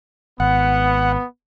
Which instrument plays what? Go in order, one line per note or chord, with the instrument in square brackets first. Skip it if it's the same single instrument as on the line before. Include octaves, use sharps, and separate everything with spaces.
[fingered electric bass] G#1 [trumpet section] B3 [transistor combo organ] F#5